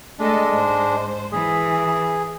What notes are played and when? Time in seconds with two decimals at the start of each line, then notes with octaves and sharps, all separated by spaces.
0.19 G#3 A3 D4 A4 D#5
0.51 G#2 C5
1.32 E3 G#4